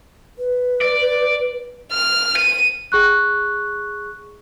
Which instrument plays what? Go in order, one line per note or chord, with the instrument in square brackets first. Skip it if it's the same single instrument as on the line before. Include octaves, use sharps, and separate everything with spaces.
[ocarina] B4
[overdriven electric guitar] D5
[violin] F6
D#7
[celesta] G#4 C#6 F#6